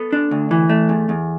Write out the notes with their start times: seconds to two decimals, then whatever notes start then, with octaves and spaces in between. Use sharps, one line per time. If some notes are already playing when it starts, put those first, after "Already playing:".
Already playing: B3 A4
0.12 D4
0.31 D2
0.51 E3
0.69 A3
0.89 E2
1.09 E2